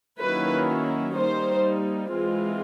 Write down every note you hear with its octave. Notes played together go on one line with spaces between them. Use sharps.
D#3 F#3 A#3 C#4 E4 B4
G3 A#3 D#4 C5
E3 G#3 C4 F4